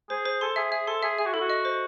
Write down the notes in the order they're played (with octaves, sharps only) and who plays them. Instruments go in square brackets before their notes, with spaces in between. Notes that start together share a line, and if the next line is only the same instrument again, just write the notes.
[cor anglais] G#4 [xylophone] C5
[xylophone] C5
[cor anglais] A4 [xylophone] C6
[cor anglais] G#4 [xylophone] E5
[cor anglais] G#4 [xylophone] E5
[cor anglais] A4 [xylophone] C6
[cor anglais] G#4 [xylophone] E5
[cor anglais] G#4 [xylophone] E5
[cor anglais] F#4
[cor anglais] E4 [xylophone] A4
[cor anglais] F#4
[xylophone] D#5
C5